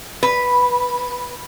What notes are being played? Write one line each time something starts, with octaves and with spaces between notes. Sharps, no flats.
B4